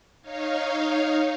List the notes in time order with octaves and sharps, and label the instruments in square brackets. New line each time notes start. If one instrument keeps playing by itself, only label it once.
[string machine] D#4 C#5 F5